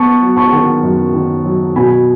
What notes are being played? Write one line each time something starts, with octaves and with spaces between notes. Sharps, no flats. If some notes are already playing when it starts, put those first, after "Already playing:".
Already playing: B3 A5 C#6
F#3
A5 C#6
D#3
F#2
D#3
F#3
B2 G#5 B5